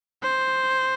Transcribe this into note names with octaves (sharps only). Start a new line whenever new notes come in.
C5